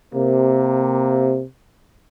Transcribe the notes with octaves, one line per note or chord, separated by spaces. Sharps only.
C3 A#3